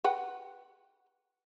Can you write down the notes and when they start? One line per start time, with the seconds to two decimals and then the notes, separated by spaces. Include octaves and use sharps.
0.04 B4 F#5 G5